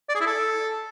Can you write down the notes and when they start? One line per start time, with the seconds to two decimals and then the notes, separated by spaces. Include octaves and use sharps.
0.09 D5
0.15 G#4
0.21 E4
0.26 A4